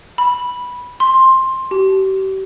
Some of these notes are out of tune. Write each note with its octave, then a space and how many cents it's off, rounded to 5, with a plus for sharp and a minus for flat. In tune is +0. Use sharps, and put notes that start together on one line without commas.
B5 -10
C6 +15
G4 -40